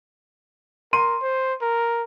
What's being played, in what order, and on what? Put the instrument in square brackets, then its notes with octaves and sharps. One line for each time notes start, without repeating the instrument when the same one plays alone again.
[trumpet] A#4 [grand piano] C6 D#7
[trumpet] C5
A#4